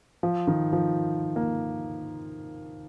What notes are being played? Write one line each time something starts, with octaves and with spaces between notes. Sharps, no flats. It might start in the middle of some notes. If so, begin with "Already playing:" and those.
F3
D#3
F3
A#3